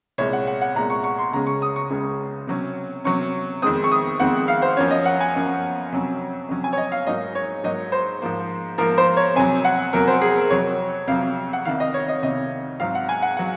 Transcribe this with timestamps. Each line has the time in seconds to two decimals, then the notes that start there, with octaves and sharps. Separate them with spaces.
0.18 C2 A#2 G#3 C#5
0.33 F#5
0.47 F#5
0.61 F#5
0.75 C2 A#2 G#3 A#5
0.90 C#6
1.04 C#6
1.18 C6
1.32 C#2 C#3 G#3 C#4 A#5
1.47 C#6
1.62 D#6
1.76 C#6
1.90 C#2 C#3 G#3 C#4
2.47 C3 F#3 C#4
3.04 C3 F#3 C#4 C#6
3.62 F2 D#3 G#3 C4 D#6
3.84 C#6
3.92 D#6
4.20 F2 D#3 G#3 C4 F#5
4.48 F5
4.62 C5
4.77 F#2 F3 A#3 C#4 C#5
4.91 D#5
5.05 F#5
5.21 G#5
5.34 F#2 F3 A#3 C#4
5.92 F2 C3 F#3 C#4
6.49 F2 C3 F#3 C#4
6.64 G#5
6.73 C#5
6.77 D#5
6.92 F5
7.07 G#2 F#3 A#3 D#4 D#5
7.35 C#5
7.64 G#2 F#3 A#3 D#4 D#5
7.92 C5
8.22 G#2 F3 A#3
8.78 G#2 F3 A#3 A#4
8.98 C5
9.17 C#5
9.36 F2 C3 F#3 G#5
9.65 F#5
9.93 F2 C3 F#3 A#4
10.07 C5
10.22 G#4
10.37 A#4
10.50 F2 C3 F#3 C#5
11.07 F2 C3 F#3 F5
11.53 F#5
11.65 C2 C3 D#3 F5
11.80 D#5
11.94 C#5
12.08 D#5
12.22 C2 C3 D#3 D#5
12.80 G#2 F#3 C4 F5
12.95 F#5
13.09 G#5
13.22 F#5
13.37 F#3 F#5